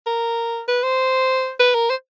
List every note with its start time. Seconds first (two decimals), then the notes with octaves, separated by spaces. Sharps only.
0.06 A#4
0.68 B4
0.83 C5
1.59 B4
1.75 A#4
1.90 C5